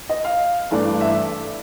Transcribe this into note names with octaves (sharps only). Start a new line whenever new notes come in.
D#5
F5
G2 E3 A3 D4
E5